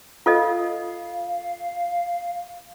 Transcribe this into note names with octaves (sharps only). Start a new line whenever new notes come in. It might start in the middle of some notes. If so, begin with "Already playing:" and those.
F4 A4 D#5 F5